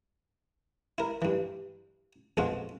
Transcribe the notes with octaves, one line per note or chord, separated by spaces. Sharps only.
E4 A#4
G2 E3
A#1 F2 B2 G#3 F4 F#4